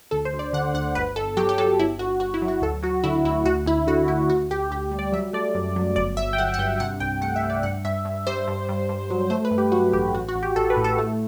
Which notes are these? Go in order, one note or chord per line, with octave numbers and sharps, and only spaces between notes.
D2 A4
C5
D2
D5
D3 F#5
D2 F#5
G1 B4
G1 A4
F#3 G4
G4
F#3 A4
G1 E4
G1 F#4
G1 F#4
E4
F#3
F#4
D2 A4
F#3 F#4
D3 E4
D2 E4
D2 F#4
D2 E4
D3 F#4
D2 E4
D2 F#4
D2 G4
D2 G4
G3
D5
F#3 E5
A3 D5
F#2
F#3
G1 D5
G1 E5
G5
G1 F#5
F#5
G2 G5
C3 F#5
C2 G5
A3 F#5
E5
C3
D5
G2 F#5
G2 E5
G2
G3 C5
G2
G2
G2
F#3
A3 C5
B4
G2
G4
F#3 F#4
A1 G4
A1 F#4
F#4
A1
G4
A1 A4
B4
A2
A4
A3